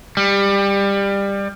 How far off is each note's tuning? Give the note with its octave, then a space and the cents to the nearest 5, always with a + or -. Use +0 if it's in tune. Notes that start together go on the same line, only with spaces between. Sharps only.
G3 +20